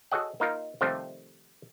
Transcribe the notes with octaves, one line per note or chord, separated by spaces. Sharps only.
F#4 G#4 A4 C#5 D#5 F#5
A#3 D#4 F4 A#4
C3 D#3 F3 G3 A3 C4